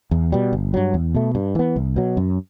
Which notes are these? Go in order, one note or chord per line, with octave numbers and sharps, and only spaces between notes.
E2
B2 G3
G1
G2 F#3
E2
B2 A3
G2
E3 B3
C2
B2 F#3
F#2